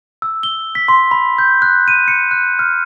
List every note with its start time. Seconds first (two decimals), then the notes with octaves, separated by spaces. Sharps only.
0.22 E6
0.43 G7
0.75 B6
0.88 C6
1.11 B5
1.38 G6
1.62 F#6
1.88 D#7
2.08 C#7
2.31 F#6
2.59 F6